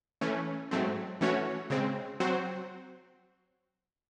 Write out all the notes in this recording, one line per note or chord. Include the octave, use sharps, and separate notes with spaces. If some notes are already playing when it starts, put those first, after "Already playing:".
E3 A3 C#4
G#2 F#3 A3 C4
E3 A3 C#4 F#4 C#5
C#3 G#3 C4
F#3 C4 F#4 C5